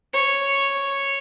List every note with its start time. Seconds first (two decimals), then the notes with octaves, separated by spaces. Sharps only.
0.13 C#5